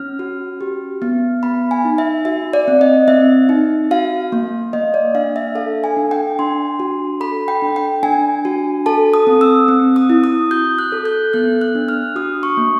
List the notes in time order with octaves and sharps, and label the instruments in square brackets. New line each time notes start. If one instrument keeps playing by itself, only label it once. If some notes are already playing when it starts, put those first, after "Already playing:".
Already playing: [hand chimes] C#4 F6
F#4
G4
B3
B3 B5
G#5
D#4
E5
F#4 E5
D5
C4
D#5
C4 E5
D#4
F#4 F5
A#3
A#3 D#5
D5
D4 F5
E5
A4 F5
G#5
D4
G5
D4 C6
F#4
A4 B5
G5
D4
G5
D4 G#5
F#4
A4 A5
D#6
C4
E6
C4
D#6
E4
D#6
F#4 G6
F#6
A4
G6
B3 F#6
F#6
D4
F6
F#4 D#6
C#6
A#3